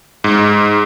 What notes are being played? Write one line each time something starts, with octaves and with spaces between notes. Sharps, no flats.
G#2